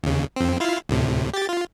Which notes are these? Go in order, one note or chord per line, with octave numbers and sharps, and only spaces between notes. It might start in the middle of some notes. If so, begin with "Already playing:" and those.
D#2 C#3
F2 C4
E4 F4 F5
D2 A2 C3
G4 A6
F4